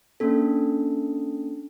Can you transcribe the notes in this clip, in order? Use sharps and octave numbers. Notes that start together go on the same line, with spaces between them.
A#3 C#4 D4 A4